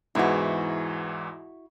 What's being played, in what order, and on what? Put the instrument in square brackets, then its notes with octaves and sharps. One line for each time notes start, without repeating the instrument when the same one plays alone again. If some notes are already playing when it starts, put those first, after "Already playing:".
[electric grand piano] E2 G#2 E3 [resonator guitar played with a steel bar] E4 F#4